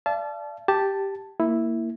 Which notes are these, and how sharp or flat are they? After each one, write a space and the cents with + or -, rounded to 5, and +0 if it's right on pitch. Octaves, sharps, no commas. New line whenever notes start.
D5 +0 F5 -45 A5 -25
G4 +0 A5 +0
A#3 -10 E4 +0